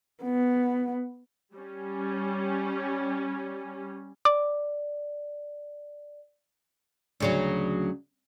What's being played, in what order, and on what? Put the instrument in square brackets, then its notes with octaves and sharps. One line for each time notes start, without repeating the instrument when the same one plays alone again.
[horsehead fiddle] B3
[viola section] G3 C#4
[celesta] D5 [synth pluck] D6
[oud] D2 C#3 F#3